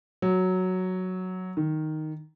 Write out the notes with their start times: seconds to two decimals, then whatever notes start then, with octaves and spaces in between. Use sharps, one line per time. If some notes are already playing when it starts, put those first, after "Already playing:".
0.22 F#3
1.57 D#3